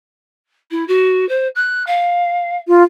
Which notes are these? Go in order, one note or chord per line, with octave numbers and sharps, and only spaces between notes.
E4
F#4
C5
F#6
F5
F4